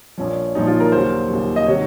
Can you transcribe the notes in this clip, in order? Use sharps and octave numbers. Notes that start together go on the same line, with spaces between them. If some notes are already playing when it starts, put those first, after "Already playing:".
A#1 A#2 F3 C#4
A#1 A#2 F3 D#4
F4
A#4
D#2 C#3 F#3 C5
D#2 C#3 F#3
D#5
C3 D#3 F#3 C#5